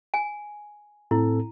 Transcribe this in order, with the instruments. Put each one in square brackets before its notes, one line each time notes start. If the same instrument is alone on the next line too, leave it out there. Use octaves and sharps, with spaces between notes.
[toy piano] G#5
[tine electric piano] A2 C4 A4 [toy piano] E4